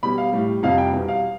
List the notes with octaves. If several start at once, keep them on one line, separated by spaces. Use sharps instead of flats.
B2 G3 B5
F5
A2 G3
F2 C3 G3 F5
G5
E2 B2 G3
F5